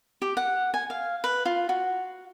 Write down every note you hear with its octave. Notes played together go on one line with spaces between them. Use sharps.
G4
F#5
G#5
F5
B4
F4
F#4